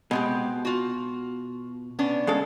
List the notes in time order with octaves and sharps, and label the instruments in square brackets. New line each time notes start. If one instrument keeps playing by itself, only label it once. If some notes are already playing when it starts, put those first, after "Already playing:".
[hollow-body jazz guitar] B2 [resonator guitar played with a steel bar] G#3 C4 G4
[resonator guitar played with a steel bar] F4 F#4
B3 C#4 D4
[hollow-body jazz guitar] C#3 G#3 A4